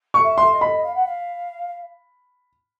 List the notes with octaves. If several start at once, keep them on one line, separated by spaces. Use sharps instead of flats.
C#6
E5
C6
D#5
B5
F5
F#5
F5